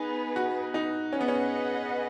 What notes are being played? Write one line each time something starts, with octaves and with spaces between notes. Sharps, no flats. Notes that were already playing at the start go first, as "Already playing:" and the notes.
Already playing: B3 D#4 G#4 B4
F#4
D#4
C#4 G#4 B4 D#5 F#5
B3
C#4